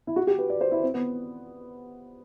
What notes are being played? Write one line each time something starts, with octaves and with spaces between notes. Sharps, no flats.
E4
F#4
G4
B4
D5
C5
E4
C4
B3